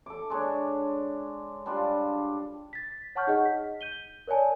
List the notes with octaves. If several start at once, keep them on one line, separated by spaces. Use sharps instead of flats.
A4 D6
G#3 D4 C#5
G3 D4 F4
A6 B6
C#5 F#5 A5 C#6 F6 G6
D#4 G#4 D#5 F#5
B6
G6 D#7 G7
A#4 C#5 D5 G#5 A5